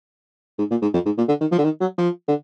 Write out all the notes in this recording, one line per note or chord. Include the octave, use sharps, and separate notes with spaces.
G#2
A#2
G#2
F2
G#2
A#2
D3
D#3
F3
D3
D#3
F#3
F3
D3